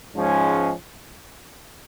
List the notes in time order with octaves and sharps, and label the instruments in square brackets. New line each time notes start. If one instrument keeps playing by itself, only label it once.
[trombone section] G#2 F3 G#3 C#4